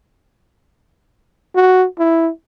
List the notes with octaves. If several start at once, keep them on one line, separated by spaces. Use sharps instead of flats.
F#4
E4